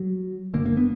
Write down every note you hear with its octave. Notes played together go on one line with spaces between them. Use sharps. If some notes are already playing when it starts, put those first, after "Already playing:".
Already playing: F#3
F#1 F#2 D3 A#3
A#3
B3